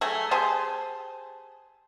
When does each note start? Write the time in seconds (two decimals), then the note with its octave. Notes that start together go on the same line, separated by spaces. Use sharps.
0.01 F#3 A3 G#4 E5
0.31 G4 G#4 C5 A5